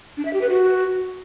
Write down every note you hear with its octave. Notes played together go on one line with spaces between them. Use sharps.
D4
E5
G4
B4
F#4